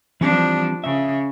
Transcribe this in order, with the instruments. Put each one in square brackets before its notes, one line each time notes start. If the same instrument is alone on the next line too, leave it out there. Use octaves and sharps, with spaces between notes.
[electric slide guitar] E3 G3 C4 [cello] F3 D4
[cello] C#3 [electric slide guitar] E5